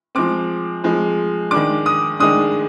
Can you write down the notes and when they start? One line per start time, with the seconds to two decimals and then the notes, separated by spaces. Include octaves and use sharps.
0.15 F3 G#3 C4 D6
0.84 F3 G#3 C4
1.51 D#3 G#3 D4 D6
1.86 D#6
2.20 D#3 G#3 D4 D#6